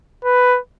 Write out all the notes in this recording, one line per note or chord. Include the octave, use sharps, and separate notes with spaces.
B4